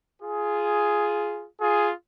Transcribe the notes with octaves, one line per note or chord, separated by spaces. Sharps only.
F4 G#4
F4 G#4